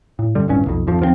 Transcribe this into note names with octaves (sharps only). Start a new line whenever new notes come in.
A2
F#2 D3 G3
D1 G#1 G2 C#4
B1 F2
G#1 F2 F3
D#2 F3 G3 C4